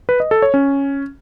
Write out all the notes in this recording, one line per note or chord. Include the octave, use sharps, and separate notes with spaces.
B4
D#5
A4
C#5
C#4